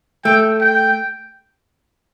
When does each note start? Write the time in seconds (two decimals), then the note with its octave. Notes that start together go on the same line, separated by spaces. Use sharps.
0.25 A3 G5
0.60 G5